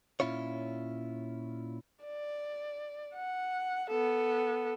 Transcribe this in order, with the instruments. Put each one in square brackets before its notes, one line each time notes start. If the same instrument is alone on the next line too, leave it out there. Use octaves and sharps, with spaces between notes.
[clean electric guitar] A#2 C#4 E4 F4 C#5
[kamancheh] D5
F#5
B3 A4